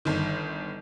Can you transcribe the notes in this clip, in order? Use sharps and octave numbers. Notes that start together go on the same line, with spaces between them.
G1 D#3